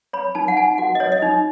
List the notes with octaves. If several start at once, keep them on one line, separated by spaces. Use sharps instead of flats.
C#5 B5
D#4 A5
F#5
D#4 G#5
F#4 F#5
C#5 D#5
D#5
D#4